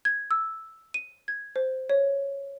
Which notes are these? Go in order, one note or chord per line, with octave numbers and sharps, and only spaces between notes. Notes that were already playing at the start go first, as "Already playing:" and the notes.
G#6
E6
D#7
G#6
C5
C#5